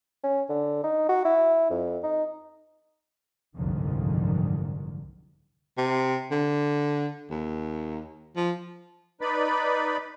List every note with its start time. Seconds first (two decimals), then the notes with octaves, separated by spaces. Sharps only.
0.24 C#4
0.49 D3
0.84 D#4
1.09 F#4
1.25 E4
1.70 F2
2.03 D#4
3.56 F#1 C2 F2 G#2 D3 D#3
5.78 C3
6.31 D3
7.31 D#2
8.36 F3
9.21 D#4 B4 D5 B5